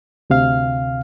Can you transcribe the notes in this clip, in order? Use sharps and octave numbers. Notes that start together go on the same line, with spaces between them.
D2 C3 F5 F6